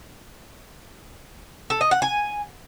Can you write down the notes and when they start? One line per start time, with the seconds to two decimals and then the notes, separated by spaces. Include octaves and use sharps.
1.70 A4
1.81 D#5
1.91 F#5
2.02 G#5